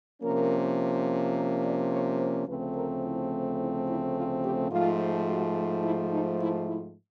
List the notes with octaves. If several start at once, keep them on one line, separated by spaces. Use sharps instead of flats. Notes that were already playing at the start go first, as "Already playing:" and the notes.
C3 F3 A#3 C#4 A#4
A#4
D5
C#5
C5
D2 C#3 F3 A3 C4 B4
A#4
E4
E4
E4
F4
G4
G#2 F3 A3 F4
F#4
E4
D#4
E4
E4